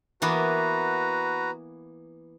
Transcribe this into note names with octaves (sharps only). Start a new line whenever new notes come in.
E3 A#3 B3 F#4 B4 A#5